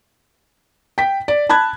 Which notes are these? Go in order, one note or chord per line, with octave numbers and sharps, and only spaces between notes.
G5 B6
D5
A5 B5 F#6 G#6